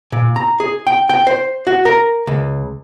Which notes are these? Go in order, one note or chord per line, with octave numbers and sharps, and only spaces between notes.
A#2
A#5
G#4
G5
G5
C5
F#4
A#4
C#2